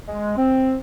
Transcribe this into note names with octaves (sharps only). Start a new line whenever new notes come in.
G#3
C4